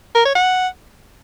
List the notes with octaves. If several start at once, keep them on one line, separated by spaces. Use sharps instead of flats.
A#4
C#5
F#5